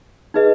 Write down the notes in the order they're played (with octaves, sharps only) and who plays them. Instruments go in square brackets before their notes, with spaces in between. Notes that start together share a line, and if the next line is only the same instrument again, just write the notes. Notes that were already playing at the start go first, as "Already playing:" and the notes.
[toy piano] D#4 G#4 B4 D#5